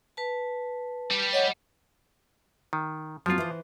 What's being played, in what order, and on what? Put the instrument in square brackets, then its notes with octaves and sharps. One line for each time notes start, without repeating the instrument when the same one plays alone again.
[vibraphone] B4 A5
[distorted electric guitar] G3 G4
[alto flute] C#5 [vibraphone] D#5 F#5
[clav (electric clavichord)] D#3
[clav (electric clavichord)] F3 F4 [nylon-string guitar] F#3 B3 C4
[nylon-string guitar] E3 C5